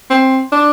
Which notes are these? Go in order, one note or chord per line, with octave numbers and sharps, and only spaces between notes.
C4
D4